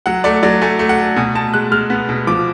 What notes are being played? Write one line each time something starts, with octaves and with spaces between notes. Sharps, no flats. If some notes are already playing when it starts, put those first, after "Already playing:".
F#3 F#5
A3 D5
F#3 D5
A3 G#5
A3
F#5
A3
B2 G#5
B2 A5
G#3 F#6
G#3 F6
B3
B2
F3 D6